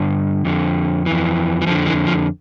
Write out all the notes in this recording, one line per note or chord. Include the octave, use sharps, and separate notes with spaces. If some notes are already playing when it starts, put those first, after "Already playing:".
Already playing: G2 D3
F2 D3
F2 E3
E3
F2 D3 F3
E3
F3